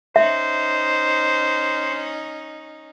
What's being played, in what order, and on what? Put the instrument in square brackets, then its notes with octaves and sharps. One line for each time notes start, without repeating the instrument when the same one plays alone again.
[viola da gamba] C#4 D#4 [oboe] C5 [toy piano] E5